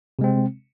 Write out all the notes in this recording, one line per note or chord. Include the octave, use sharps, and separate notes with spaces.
C3 G#3 C4